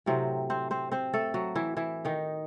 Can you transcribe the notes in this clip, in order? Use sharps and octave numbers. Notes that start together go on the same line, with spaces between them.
A2 C3 F#3 C4
C4 C5
C4 C5
C4 C5
A3 A4
F#3 F#4
E3 E4
E3 E4
D#3 D#4